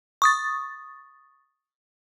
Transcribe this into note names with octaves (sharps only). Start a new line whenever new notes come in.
C#6 D#6 A6